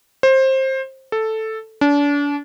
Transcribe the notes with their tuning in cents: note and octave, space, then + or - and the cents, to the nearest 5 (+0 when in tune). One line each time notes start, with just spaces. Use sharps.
C5 +20
A4 +0
D4 -35